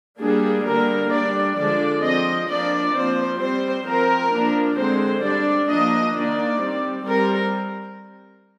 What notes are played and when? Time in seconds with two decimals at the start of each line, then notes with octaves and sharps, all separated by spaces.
0.20 G3 A#3 D4 G#4
0.65 D3 G3 A#3 D4 A#4
1.11 G3 D4 D5
1.57 D3 F3 G#3 D4 D5
2.02 F3 C4 D#5
2.48 F3 A#3 D4 D5
2.94 F3 C4 C5
3.39 G3 C4 C5
3.86 F3 C4 A#4
4.32 F3 A#3 D4
4.77 D3 G#3 C4 C5
5.22 G3 D4 D5
5.68 F3 A#3 D4 D#5
6.15 D#3 A#3 D4 D5
6.61 G3 C4
7.06 G3 C4 A#4